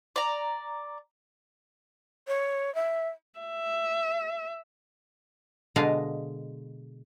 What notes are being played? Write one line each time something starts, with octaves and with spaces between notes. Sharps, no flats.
D5 A#5
C#5
E5
E5
B2 D3 G#3 D#5 F5